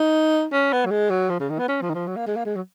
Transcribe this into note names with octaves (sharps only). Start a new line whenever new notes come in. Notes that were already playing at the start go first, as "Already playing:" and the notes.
Already playing: D#4
C#4
B3
F#3
G#3
F#3
F3
C#3
D#3
B3
C#4
F3
D#3
F3
F#3
A#3
G#3
A#3
G#3
F#3